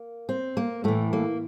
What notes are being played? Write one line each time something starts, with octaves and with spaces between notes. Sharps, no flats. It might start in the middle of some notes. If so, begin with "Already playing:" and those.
Already playing: A#3
C4
A#3
A2 E3 A3
A#3